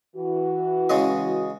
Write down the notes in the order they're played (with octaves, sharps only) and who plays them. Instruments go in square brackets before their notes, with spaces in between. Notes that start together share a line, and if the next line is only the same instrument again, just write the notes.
[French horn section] E3 F#4
[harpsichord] C#3 G#3 D#5